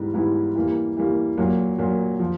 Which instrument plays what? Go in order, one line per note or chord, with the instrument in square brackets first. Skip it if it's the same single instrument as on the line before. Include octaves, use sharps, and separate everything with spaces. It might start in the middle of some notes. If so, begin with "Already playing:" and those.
Already playing: [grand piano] G#2 E3 G3 B3 E4
G#2 E3 G3 B3 E4
E3 G3 A#3
E3 G3 A#3
A#2 F#3 A#3
A#2 F#3 A#3
F3